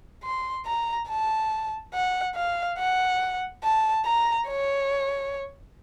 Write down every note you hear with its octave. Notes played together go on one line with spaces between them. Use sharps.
C6
A#5
A5
F#5
F5
F#5
A5
A#5
C#5